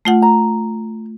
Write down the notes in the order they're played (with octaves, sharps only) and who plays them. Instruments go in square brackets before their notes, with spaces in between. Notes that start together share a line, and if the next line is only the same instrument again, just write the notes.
[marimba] A3 F4 F#5
[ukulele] A#5